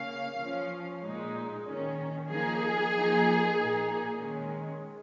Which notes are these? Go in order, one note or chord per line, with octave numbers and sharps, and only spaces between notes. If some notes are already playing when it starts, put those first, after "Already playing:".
Already playing: C#3 A#3 C#4 F5
F3 C#4
A#2 G#3 D#4
D#3 C#4
F3 A#3 D#4 G#4
F3 A#3 D#4
A#2 A#3 D#4
D#3 G#3 C#4